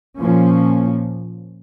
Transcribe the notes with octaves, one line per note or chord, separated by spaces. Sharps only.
A#2 F3 A#3 C#4